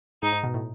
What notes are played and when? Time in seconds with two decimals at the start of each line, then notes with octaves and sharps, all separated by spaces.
0.22 G#2 D#4
0.33 G#2
0.44 B2
0.54 A2